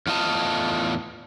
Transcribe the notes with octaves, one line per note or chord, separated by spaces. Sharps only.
E2 A2 F4 D#5 A5